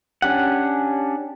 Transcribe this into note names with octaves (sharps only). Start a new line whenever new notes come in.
C#4 D4 G4 F#5